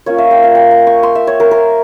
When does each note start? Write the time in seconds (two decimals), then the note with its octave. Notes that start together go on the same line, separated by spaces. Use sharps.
0.06 A#3 C#4 F4 C#5
0.18 E5
0.31 G5
0.43 F5
0.55 G5
0.71 A#5
0.87 C#6
1.03 C6
1.15 E5
1.27 C#5
1.40 A#4
1.51 A#4